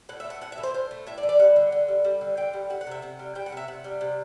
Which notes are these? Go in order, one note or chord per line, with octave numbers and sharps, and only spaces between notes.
A2 F#5
E5
A3
F#5
A2 F#5
E5
E3
C5
A2 C5
A3
A2 E5
D5
E3
D5
G3 F#5
D3
D3
G3
G3
D3
D3 G5
G3
G3 F#5
F#5
C3 E5
C3 F#5
G3
G3 G5
F#5
C3 E5
C3 F#5
G3
C3